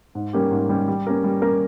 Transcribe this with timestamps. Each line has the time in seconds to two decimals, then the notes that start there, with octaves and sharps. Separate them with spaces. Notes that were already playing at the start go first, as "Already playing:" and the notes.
0.15 G#2
0.33 G3 A#3 C#4 G4
0.51 G#2
0.69 G3 A#3 C#4 G4
0.88 G3
1.07 A#3 C#4 G4 A#4
1.24 G3
1.42 A#3 C#4 G4 A#4